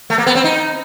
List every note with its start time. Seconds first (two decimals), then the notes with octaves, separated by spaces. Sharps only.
0.10 A3
0.18 A#3
0.26 B3
0.35 C4
0.44 D#4